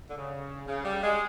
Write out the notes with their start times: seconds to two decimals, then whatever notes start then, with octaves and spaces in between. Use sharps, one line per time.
0.10 D3
0.16 C#3
0.68 C#3
0.85 G3
1.03 G#3